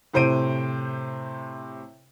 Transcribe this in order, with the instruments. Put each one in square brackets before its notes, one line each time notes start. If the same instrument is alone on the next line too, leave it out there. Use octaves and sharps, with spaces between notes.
[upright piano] A2 C3 C5 C6 D7 D#7